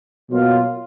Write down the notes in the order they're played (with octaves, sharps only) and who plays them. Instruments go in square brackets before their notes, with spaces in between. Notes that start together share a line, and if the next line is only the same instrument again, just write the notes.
[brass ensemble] B2 F#3 A#3 F4